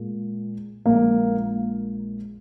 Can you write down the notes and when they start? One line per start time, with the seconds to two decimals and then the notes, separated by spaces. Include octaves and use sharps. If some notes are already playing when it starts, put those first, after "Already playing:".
Already playing: A#2 G#3
0.86 A#1 A#2 G#3 A#3